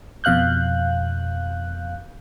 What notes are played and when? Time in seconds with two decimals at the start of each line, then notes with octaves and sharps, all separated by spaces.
0.24 F2 B2 F5 F#6 G6